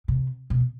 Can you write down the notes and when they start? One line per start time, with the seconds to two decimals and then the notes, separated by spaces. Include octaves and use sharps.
0.08 C3
0.50 B2